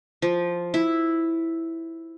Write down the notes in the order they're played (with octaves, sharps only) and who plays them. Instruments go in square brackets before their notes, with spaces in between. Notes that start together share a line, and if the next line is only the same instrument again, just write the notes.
[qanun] F3
E4